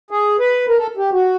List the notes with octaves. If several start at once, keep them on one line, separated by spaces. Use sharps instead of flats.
G#4
B4
A#4
A4
G4
F#4